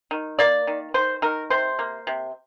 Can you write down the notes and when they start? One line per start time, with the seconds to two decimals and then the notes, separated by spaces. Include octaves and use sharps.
0.11 D#3
0.39 A#3 D5
0.67 D#3
0.94 D#3 C5
1.22 D#3 A#4
1.50 C3 C5
1.79 A#3
2.07 C3